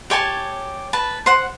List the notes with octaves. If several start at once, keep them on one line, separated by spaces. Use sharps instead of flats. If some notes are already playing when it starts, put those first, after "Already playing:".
G4 C#5 G#5 A5
B4 A5
C5 F#5